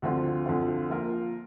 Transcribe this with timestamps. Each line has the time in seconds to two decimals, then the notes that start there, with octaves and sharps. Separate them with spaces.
0.02 D2 D3 F3 C4 F4
0.46 D2 D3 F3 C4 F4
0.90 F3 A#3 F4 A#4